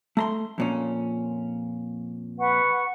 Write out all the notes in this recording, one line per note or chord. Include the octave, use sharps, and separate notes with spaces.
A3 A#5 C6
F2 A#2 C#4
B4 F#5 C#6